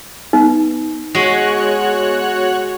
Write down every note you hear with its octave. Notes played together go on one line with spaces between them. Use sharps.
B3 D#4
G#3 F#4 C#5 F#6